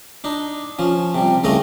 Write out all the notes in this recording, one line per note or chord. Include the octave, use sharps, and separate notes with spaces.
D4 D#4
F3 C#4
C3 G3
C2 C#3 A3 D#5 A#5